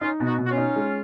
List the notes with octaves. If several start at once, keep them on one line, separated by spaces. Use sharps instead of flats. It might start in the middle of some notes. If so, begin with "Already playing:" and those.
C#4 D#4 F4
B2
D#4 F#4
B2
F#4
C#4 F4
D#4
G#3